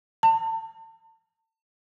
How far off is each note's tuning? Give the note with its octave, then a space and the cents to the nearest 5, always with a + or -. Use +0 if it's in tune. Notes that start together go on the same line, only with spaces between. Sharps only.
A5 +35